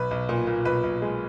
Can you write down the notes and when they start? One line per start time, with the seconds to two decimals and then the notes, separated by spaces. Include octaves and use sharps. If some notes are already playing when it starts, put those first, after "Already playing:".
Already playing: B1 B4
0.11 B1
0.29 A#2
0.47 A#2
0.65 B1 B4
0.83 B1
1.02 G#3